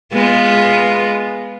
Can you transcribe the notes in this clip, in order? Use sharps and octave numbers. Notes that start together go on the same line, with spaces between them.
G#3 B3 F4